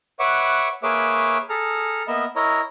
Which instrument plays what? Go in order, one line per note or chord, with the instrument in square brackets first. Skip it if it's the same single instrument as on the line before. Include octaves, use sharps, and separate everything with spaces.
[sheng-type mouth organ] B4 C#5 E5 F#5 C#6 D6
A#3 G#4 B4 C#5 E5 D6
G#4 A4 A#5 F6
A#3 B3 D#5 E5 B5
E4 A#4 C#5 D#5 A#5